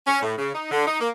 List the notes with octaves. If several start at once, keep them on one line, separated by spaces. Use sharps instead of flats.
C#4
A2
C#3
D#4
D3
D#4
A#3